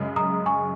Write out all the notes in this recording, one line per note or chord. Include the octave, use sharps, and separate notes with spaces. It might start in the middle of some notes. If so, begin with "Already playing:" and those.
Already playing: F#2 C#3 G#3
A#5 D#6
G#5 C#6